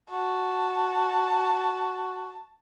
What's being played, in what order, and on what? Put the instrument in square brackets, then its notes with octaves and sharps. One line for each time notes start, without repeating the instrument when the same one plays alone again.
[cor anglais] F#4 [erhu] A5